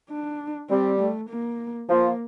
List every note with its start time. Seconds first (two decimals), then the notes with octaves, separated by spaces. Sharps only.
0.10 D4
0.69 G3 C4
1.00 A3
1.30 A#3
1.89 F3 A#3